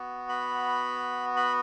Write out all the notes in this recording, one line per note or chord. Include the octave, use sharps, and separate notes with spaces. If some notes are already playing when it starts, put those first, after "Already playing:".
Already playing: B3 F#4
B5
B5